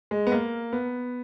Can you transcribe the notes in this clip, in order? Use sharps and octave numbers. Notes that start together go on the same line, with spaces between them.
G#3
B3
A#3
B3